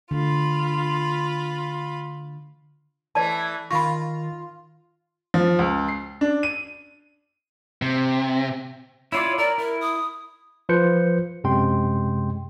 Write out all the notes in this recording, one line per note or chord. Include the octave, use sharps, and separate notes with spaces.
D3 F4 B5
E3 A3 D5 A5
D#3 F4 B5 C#6 A#6
F3
C#2
C7
D4
D#7
C3
E4 F4 C#5 D5
A#4 D5
E4 A#4
D#6
F3 F4 B4 G6 C#7
F#2 C3 G#3 G5 C6